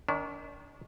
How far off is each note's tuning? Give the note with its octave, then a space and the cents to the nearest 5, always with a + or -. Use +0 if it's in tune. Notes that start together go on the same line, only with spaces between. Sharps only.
D#3 +0 D4 -40